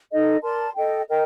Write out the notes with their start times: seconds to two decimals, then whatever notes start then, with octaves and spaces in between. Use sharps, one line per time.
0.12 D#4 A4 D#5
0.43 A#4 D5 A5 C6
0.76 A4 D#5 G5
1.09 A#4 D#5 G5